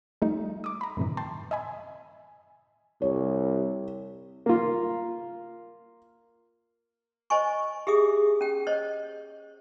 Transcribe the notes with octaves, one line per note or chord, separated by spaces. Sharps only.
F3 G3 A3 D#4
D6 D#6
A#5 B5
F#2 A2 C3 D#3 E3
G5 A5 C6
D#5 E5 G#5 B5
C2 C#5
A#3 F4
C5 D#5 G#5 C#6
G4 G#4 E5 D#6
C#4 G5
C5 C#5 D#5